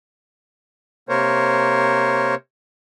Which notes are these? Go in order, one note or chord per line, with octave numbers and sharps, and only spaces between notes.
C3 A#3 A#4 C5 C#5